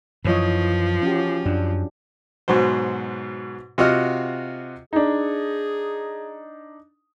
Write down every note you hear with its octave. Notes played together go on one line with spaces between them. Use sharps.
F#2 E3 F3 C#5 D#5
C#4 F#4 G4
F#2 D4
G#2 B2 F#3 C5
C3 F4 F#4 D#5 F#5 F6
D4 D#4 G#4